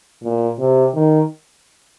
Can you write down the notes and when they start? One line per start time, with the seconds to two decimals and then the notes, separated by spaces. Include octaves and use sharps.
0.24 A#2
0.59 C3
0.95 D#3